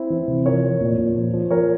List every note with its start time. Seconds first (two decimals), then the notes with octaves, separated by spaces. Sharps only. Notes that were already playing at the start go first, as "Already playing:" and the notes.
Already playing: C4 E4
0.10 E3
0.28 C3
0.45 F3 A#4 C#5
0.63 F3
0.81 A#2
0.98 A#2
1.16 F3
1.34 F3
1.51 F3 A#4 C#5